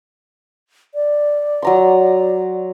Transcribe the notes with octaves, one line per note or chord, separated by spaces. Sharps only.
D5
F#3 A#5 C6